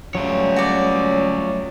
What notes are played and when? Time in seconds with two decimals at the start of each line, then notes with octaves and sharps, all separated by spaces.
0.15 F#3 G3 A3 C#4 F4 C#5
0.56 F#4 D5